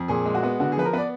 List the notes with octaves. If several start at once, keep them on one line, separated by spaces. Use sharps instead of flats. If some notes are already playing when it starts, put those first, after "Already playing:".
Already playing: F2
A#2 G#4
G#3
F#4
B3
D3 F#4
G#4
F3 B4
A#4
B3 B4 D5